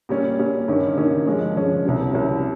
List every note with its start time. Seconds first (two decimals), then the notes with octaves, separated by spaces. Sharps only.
0.09 A#2 G3 C#4
0.39 A#2 G3 C#4
0.68 G2 D#3 A#3 C#4
0.97 G2 D#3 A#3 C#4
1.26 G2 F3 G#3 C#4
1.56 G2 F3 G#3 C#4
1.85 C2 C3 G3 C#4
2.14 C2 C3 G3 C#4